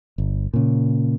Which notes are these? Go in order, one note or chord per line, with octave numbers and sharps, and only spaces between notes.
G1
A#2 C#3